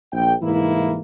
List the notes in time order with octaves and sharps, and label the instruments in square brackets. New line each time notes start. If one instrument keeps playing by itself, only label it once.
[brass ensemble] A#1 G5
C2 G#2 E3 A#3 E4